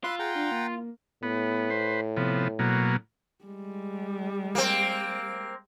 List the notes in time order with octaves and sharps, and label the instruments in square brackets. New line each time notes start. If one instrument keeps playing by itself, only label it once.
[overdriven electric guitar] F4 [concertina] B5 C6 F#6 [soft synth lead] E6
[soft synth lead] G#4 [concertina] F#5 G5 A#5
[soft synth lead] D4
A#3
[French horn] A2 [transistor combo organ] B3
[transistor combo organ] B4 C5
C3 F3 B3
B2 F#3 A#3
[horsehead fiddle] G3 G#3
[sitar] A#3 C4